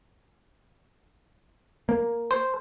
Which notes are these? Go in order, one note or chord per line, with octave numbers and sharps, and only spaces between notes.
A#3
C5